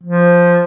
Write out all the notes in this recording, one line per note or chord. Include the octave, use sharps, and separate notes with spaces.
F3